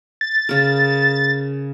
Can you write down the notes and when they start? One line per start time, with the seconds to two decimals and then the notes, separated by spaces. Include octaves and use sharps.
0.21 A6
0.49 C#3 A#4